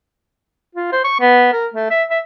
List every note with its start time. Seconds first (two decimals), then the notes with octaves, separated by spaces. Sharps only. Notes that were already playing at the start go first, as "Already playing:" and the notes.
0.75 F4
0.92 C5
1.04 C#6
1.20 B3
1.53 A#4
1.74 A3
1.90 E5
2.10 E5